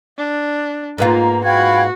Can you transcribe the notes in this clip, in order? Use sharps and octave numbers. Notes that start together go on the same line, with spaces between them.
D4
G#2 A#3 B3 F4 A#5
F#4 F5 G5 B5 G#6